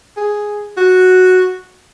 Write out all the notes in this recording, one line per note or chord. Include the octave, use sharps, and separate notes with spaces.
G#4
F#4